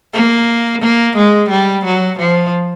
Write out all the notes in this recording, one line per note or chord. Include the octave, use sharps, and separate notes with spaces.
A#3
A#3
G#3
G3
F#3
F3